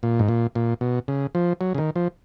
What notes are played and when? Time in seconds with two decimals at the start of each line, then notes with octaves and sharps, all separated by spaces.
0.03 A#2
0.19 G#2
0.28 A#2
0.55 A#2
0.81 B2
1.08 C#3
1.35 F3
1.61 F#3
1.75 C#3
1.78 D#3
1.96 F3